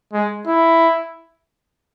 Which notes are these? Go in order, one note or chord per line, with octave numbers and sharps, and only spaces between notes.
G#3
E4